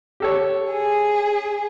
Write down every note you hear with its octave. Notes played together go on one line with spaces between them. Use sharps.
G4 A4 C#5
G#4